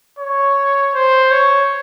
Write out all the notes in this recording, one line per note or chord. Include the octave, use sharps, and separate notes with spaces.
C#5
C5
C#5